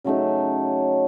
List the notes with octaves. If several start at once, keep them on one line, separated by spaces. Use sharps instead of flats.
C#3 F#3 A3 D#4